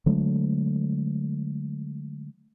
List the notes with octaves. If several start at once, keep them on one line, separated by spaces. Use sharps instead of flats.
D3 F#3 G#3 A3